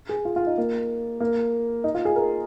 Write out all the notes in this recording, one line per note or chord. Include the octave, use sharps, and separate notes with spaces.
G#4
F4
F4
D#4
A#3
A#3
D#4
F4
G#4
A#4